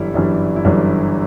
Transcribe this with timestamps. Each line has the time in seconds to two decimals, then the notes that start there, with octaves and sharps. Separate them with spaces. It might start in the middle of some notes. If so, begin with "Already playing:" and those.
Already playing: G1 F#2 E3 G3 E4
0.14 G1 F#2 E3 G3 D4
0.56 E4
0.65 G1 F#2 E3 G3 D4